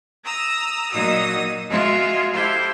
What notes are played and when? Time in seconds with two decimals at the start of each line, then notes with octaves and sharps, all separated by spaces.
0.24 A#5 D#6 E6
0.91 A#2 F#3 D#4 F#4 D#6 E6
1.69 G#3 F4 F#4 E5
2.33 E4 F4 G4 A4 C5